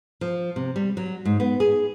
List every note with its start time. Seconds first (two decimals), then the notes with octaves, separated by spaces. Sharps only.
0.21 F3
0.56 C3
0.76 G3
0.97 F#3
1.25 G#2
1.40 B3
1.60 G#4